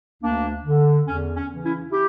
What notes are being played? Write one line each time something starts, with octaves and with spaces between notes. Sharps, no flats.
D2 A#3 D4
D3
E2 C#4
C#4
C#3 E3
C#4 E4
E4 G4